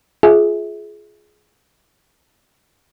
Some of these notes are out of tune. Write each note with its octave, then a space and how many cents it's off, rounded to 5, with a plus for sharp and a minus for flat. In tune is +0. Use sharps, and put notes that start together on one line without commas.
F4 +0 G#4 +15 E5 -25